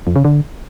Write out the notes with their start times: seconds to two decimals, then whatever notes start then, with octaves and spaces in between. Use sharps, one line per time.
0.07 F2
0.16 C#3
0.25 D3